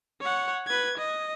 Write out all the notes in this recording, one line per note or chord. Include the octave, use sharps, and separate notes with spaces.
C#5 F#5
B4 G#6
D#5